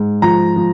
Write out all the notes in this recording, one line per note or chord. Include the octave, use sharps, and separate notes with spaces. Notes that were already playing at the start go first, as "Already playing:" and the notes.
Already playing: G#2
F3 A#5
F3